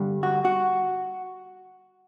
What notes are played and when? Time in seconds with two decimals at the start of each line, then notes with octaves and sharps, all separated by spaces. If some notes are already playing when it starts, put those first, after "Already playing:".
Already playing: G2 D3 G3
0.23 F#4
0.45 F#4